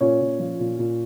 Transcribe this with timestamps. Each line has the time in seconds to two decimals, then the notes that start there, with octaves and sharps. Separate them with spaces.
0.01 A#2 C#4 C#5
0.21 A#2
0.40 F3
0.60 A#2
0.79 A#2